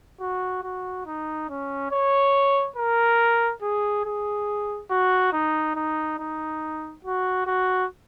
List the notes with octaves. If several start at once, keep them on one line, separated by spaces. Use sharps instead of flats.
F#4
F#4
D#4
C#4
C#5
A#4
G#4
G#4
F#4
D#4
D#4
D#4
F#4
F#4